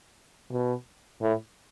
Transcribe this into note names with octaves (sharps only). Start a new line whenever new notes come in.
B2
A2